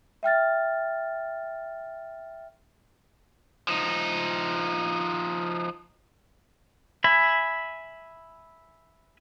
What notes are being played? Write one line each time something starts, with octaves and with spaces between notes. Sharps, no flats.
E5 G5 F6 A6
F3 D#4
E5 G#5 B5